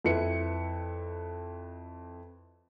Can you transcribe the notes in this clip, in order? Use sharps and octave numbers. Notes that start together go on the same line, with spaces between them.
F2 E4 B4 C#7